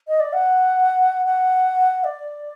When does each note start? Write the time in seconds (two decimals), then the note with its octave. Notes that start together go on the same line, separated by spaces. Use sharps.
0.08 D#5
0.20 D5
0.33 F#5
1.26 F#5
2.04 D5